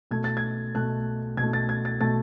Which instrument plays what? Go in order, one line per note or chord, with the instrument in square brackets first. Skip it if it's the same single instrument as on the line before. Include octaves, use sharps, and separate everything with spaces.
[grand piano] B2 A3 G#6
A6
G#6
B2 A3 F#6
B2 A3 G#6
A6
G#6
A6
B2 A3 A6